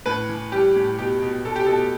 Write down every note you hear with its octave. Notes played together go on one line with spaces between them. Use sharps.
A2 B4
E3
G3 G4
A2
B2 G4
B2
B2 A4
G4
B2 A4